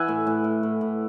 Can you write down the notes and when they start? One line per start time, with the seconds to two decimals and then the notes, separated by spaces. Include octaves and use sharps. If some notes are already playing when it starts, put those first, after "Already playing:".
Already playing: E3 E5 F#5 G#5
0.08 A2
0.27 A2
0.44 A2
0.63 A2
0.81 A2